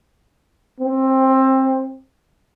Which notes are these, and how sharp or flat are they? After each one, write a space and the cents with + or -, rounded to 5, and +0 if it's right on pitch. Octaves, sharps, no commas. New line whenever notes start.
C4 +20